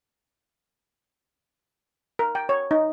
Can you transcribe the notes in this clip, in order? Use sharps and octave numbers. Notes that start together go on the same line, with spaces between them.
A#4
G5
C#5
D#4